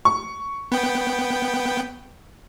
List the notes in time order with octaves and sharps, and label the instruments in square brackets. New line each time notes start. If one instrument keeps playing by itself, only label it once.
[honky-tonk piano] C#6
[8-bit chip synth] B3 G5